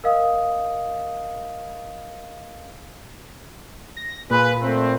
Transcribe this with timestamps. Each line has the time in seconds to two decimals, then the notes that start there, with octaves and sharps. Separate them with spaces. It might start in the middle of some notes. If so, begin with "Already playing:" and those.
0.04 A#4 D#5 F5 D#6
3.97 A#6
4.30 A#2 F4 G#4 B4
4.62 A3 C4